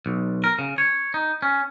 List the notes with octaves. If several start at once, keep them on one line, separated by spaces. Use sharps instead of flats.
B1
A#4
C#3
C#5
D#4
C#4